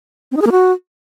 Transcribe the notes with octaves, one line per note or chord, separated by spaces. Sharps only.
C4
D#4
G#4
A#3
F#4